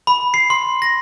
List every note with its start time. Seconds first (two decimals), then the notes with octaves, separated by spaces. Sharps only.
0.07 B5
0.34 C7
0.50 C6
0.82 A#6